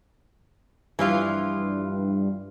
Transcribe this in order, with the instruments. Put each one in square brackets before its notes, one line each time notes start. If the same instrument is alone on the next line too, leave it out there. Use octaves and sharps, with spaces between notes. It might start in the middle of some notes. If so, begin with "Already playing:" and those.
[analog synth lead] G2 [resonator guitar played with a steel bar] E3 F3 F4